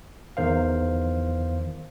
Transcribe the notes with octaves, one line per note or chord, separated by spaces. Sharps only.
E2 D#3 C5 F5